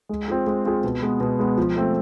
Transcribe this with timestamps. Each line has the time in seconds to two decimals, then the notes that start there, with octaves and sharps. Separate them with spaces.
0.09 G#3
0.28 C4 F4 G#4
0.47 G#3
0.65 C4 F4 G#4
0.84 B2
1.02 G#3 B3
1.20 B2
1.39 G#3 B3
1.58 F3
1.76 A3 C4